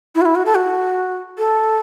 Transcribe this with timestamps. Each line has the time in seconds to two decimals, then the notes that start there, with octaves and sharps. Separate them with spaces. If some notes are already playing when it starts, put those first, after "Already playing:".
0.15 E4
0.21 F#4
0.25 E4
0.36 F#4
0.46 A4
0.56 F#4
1.38 A4